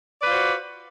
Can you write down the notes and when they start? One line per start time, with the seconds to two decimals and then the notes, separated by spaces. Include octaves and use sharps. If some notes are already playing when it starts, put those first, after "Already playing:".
0.20 D5
0.23 B4
0.26 F4
0.29 C5
0.33 F#4